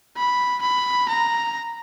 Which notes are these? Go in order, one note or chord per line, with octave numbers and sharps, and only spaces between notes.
B5
B5
A#5